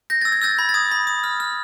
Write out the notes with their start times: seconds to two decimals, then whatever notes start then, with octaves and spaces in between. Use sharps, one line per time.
0.10 G6 A#6
0.21 E6 A6
0.32 G#6
0.42 E6 G6 A6
0.58 B5 G#6
0.69 A6
0.74 D#6 G#6
0.91 B5
1.07 D#6
1.24 F6
1.40 F6